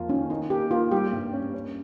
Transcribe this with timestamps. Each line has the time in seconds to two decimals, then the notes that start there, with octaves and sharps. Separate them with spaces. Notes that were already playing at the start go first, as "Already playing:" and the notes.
Already playing: F2 A#3 F4
0.09 D#3 C#4
0.30 D#3 D#4
0.50 A#3 G4
0.71 A#3 F4
0.91 G3 G4
1.12 G2
1.33 C#4
1.54 C#4